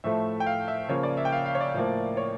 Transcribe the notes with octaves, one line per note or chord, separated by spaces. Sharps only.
A2 F3 A3 E5
G5
F5
E5
C#3 F3 A#3 C#5
D5
E5
G5
F5
F5
C#5
D5
A2 F3 A#3
C#5